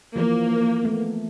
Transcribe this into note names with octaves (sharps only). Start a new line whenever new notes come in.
E3 F3 A#3
A3 B3